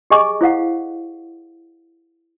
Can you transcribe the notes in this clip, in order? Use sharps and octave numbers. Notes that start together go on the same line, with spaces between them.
G4 G#4 D#5 G#5 C#6 D6
E4 C5 F5 F#5